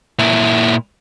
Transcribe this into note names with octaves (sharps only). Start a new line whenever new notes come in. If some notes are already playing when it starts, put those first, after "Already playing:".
A#2 E4